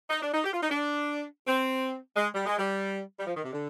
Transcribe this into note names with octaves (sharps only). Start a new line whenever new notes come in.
D#4
D4
D#4
G4
F4
D#4
D4
C4
G#3
G3
G#3
G3
G3
F3
D#3
C3
D3